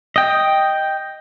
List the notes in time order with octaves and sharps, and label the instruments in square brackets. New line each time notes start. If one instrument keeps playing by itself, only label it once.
[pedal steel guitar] D#5 G5